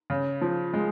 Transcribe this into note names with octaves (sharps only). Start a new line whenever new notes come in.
C#3
F3
G#3